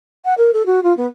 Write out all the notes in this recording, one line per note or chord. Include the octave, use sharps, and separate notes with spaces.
F#5
A#4
A4
F#4
F4
B3